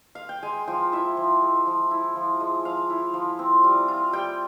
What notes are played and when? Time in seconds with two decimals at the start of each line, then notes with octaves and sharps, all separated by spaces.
0.15 F5
0.29 G5
0.43 G#3 G#5
0.68 F3 G5
0.92 E4 E5
1.17 F3
1.42 G#3
1.67 F3
1.91 E4
2.16 F3
2.40 G#3
2.65 F3 F5
2.90 E4
3.14 F3
3.39 C4
3.64 G3
3.88 F4
4.13 G3 G5